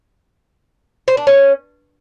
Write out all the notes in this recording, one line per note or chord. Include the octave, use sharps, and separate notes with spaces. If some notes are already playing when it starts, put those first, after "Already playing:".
C5
D4
C#4